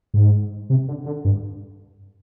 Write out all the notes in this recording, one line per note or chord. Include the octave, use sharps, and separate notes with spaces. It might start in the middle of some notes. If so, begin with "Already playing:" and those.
G#2
C3
D3
D3
G2